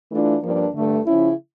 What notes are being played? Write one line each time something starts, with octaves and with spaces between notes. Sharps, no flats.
E3 A3 D4 F4
G2 F3 A#3 D4
G2 D3 A3
C#3 F3 C#4 E4